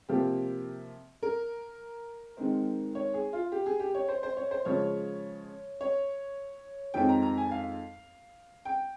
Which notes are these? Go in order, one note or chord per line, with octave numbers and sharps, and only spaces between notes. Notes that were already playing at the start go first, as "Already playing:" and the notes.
C3 F3 A#3 G4
A#4
D#3 G#3 C4
C#5
G#4
F4
G4
G#4
G4
C#5
C5
C5
C#5
C5
C#3 F3 G#3 C#5
C#5
F2 D#3 G#3 C4 D#4 G5
A#5
A#5
G#5
F5
G5